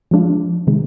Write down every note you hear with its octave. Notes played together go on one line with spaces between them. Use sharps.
F3 G#3 D4 F4
C3 D#3 G#3